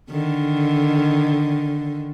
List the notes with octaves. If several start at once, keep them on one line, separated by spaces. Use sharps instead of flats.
D3 D#3